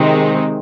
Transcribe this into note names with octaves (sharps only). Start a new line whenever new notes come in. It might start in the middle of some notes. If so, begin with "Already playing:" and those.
Already playing: C3 D#3 G#3 C4 D#4